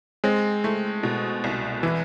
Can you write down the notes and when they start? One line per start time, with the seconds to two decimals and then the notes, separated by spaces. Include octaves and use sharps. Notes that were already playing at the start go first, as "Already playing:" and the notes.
0.24 G#3 C4
0.64 A3
1.03 B2
1.44 C2
1.83 E3 E4